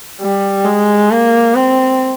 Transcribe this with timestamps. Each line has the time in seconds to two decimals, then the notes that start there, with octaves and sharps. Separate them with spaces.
0.21 G3
0.65 G#3
1.11 A#3
1.55 C4